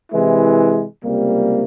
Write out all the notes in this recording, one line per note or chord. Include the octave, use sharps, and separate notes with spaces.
C3 E3 G#3 E4
C#2 C3 G3 A#3